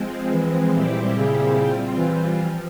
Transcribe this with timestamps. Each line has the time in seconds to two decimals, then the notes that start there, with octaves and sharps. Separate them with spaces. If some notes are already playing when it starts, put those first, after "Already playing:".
Already playing: F3 G#3 C4
0.31 E3
0.73 A#2 G3 C4 E4 G4
1.14 C#3
1.57 G3 C4 F4
1.98 E3
2.39 F3